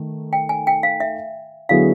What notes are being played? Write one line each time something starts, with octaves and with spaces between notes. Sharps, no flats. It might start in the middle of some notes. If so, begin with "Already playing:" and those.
Already playing: D#3 A3
G5
G#5
G5
F5
E5
D3 F#3 B3 E4 G#4 F5